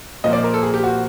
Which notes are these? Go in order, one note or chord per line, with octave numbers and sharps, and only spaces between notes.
A#2 F3 A#3 D#5
D5
A#4
A4
G#4
G4
F#4